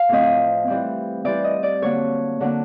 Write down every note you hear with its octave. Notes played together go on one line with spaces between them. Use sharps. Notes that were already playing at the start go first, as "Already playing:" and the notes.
Already playing: F5
A2 F3 A3 C4 D#5
E3 G3 C4
E3 G3 C4 D5
D#5
D5
D3 F#3 A#3 C#5
D3 F#3 A#3